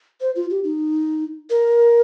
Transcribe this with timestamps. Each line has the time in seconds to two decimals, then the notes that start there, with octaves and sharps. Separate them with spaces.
0.21 C5
0.36 F4
0.50 G4
0.64 D#4
1.50 A#4